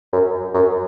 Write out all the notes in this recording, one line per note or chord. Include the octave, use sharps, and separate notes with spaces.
F#2
F#2